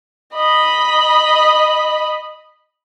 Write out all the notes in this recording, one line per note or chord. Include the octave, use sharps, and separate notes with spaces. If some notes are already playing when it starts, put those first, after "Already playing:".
D#5 B5